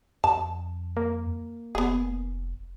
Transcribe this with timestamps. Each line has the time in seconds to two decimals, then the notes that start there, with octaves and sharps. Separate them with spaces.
0.24 F2 A5
0.97 A#3
1.75 F1 B3 G#4